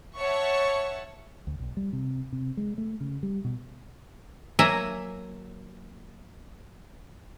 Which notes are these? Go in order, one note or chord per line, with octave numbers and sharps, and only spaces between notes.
C#5 E5 F#5 A5 C#6
D2
B1
G3
C3
C3
G#3
A3
C#3
G3
B2
F#3 A#3 E5 G#5 A#5